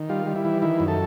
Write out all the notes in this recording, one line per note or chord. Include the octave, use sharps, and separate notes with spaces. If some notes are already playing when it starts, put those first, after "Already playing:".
Already playing: D#3
G3 F4
G3
E4
E3
D#3 E4
F#2
A4